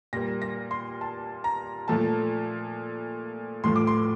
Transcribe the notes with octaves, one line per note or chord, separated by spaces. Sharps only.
A#2 G3 A#3 A#6
A#6
C6
A5
A#5
A#2 F3 A3 A5
A2 F3 A3 C6
D6
C6